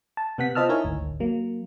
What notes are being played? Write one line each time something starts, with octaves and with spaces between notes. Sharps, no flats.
A5
C3 B3 F#5 B6
F4 C5 D#5 A5 E6 F6
D#4 E4 A#4 C#5 G#5
G#1 D2
F#3 A#3